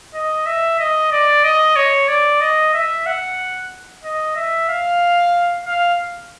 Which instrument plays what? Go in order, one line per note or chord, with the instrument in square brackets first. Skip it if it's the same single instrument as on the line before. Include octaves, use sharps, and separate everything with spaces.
[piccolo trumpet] D#5
E5
D#5
D5
D#5
C#5
D5
D#5
E5
F#5
D#5
E5
F5
F5